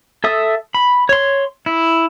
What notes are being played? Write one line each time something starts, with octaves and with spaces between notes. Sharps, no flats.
A4 E5 D#6
B5
C#5 C6
E4